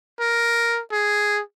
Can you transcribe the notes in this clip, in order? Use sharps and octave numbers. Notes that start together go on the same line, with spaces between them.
A#4
G#4